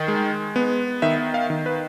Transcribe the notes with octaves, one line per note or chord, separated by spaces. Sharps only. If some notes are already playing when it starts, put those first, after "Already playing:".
Already playing: D#3
G#3
B3
D#3 E5
F5
D#3
B4